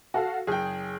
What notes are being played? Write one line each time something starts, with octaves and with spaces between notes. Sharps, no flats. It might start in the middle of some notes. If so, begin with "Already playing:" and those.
F#4 A4 F5
F#1 G#4 G5